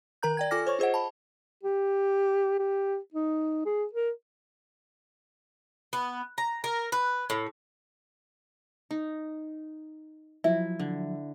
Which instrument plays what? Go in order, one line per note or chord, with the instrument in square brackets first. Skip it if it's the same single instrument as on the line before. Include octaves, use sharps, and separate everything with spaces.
[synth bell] D#3 A#4 A#5 G6
D5 G5 G#6
F4 A4 G#5 D6 F6 A#6
C5 C#5 C#6
F4 G#4 C5 D#5 F#5
A5 B5
[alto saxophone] G4
G4
D#4
G#4
A#4
[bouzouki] B3
A#5
A#4
B4
A2
[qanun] D#4
[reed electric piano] F3 F#3 [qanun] E4 [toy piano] E5
[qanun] D3